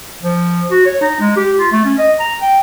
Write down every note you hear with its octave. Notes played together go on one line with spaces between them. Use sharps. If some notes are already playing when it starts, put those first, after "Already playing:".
F3
F#4
C#5
D#4
G#3
G4
F4
A3
C#4
D#5
A#5
G5